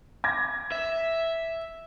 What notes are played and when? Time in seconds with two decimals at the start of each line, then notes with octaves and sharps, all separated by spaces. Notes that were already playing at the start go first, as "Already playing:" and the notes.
0.24 D6 G#6 A#6
0.72 E5